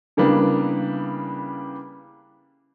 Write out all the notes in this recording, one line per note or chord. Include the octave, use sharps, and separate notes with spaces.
C#3 E3 G3 A#3 B3 D4